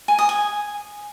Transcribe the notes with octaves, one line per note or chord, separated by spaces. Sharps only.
G#5
D#6
G#5